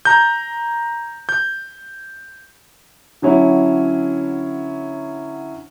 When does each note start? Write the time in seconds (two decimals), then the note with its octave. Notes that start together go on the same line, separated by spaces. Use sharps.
0.05 A#5 G6
1.29 G6
3.22 D3 F#3 C#4 E4